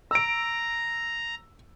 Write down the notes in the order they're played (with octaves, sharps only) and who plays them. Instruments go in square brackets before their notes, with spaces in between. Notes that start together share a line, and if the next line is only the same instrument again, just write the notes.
[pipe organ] A#5 [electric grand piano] E6 D7